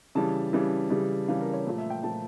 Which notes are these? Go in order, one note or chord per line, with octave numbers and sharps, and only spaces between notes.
C#3 E3 G3 A5
C#3 E3 G3
C#3 E3 G3
C#3 E3 G3 F5
A#4
C#5
A#2 F3 A3
E5
G5
A#2 F3 A3 A5